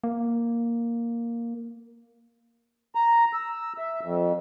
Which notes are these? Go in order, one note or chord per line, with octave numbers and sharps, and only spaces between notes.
A#3
A#5
E6
E5
F2